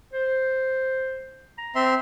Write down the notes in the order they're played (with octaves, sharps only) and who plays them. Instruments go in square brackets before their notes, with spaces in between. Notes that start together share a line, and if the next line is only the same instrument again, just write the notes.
[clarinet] C5
A#5
[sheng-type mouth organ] C4 E5 C6